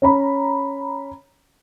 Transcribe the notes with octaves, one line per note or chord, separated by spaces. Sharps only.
C#4 A#5 B5